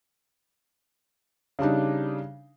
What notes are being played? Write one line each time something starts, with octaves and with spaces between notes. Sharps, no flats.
C#3 G3 D4 D#4